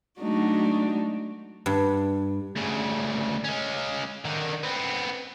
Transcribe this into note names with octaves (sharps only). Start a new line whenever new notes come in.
F#3 G#3 A3 D4 D#4 F#4
G2
D2 C#3
G#3 C#4
D3 D#3
B3 C4